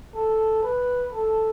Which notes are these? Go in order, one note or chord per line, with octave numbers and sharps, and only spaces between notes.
A4
B4
A4